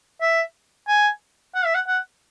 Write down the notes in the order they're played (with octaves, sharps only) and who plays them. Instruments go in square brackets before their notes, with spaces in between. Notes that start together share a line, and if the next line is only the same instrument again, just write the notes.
[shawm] E5
G#5
F#5
E5
F#5
F#5